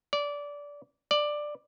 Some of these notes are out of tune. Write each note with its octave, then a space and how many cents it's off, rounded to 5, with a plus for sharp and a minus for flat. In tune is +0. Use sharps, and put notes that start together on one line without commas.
D5 -20
D5 +10